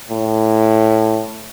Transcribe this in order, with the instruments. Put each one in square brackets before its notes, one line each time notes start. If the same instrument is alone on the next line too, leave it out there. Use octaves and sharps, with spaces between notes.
[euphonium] A2